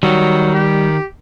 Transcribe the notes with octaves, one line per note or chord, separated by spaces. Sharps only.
D#3 F#3 G3
G4